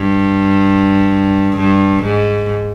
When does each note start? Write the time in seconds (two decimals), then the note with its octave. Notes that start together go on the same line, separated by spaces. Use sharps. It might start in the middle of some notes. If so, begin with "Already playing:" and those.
Already playing: G2
1.57 G2
2.03 G#2